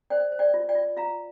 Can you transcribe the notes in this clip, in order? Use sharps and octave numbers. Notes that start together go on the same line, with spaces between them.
C5 D5 G5
C5
D5 G5
F4
D5 G5
F4
F4 F5 A#5